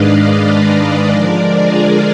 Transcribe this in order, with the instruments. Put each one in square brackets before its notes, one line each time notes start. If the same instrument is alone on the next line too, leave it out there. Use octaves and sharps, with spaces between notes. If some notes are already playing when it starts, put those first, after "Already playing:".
Already playing: [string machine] G#2 D#3 G#3 D4 B4 D5 D#5 F5
B4 D#5
B4 D#5
D5 F5
D3 F3 G#3 D4 A#4 D5
F4 G#4